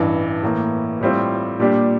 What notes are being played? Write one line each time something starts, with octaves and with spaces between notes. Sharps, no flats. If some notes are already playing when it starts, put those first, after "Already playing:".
Already playing: A1 G2 E3
A2 E3 A#3
A2 G3 C4 F4
A#2 G3 D4 G4